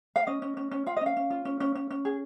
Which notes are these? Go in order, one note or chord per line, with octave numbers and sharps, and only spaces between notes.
F5
C#4 D#5
C#4
C#4
C#4
F4 F5
D#5
C#4 F5
C#4
F4
C#4
C#4
C#4
C#4
G#4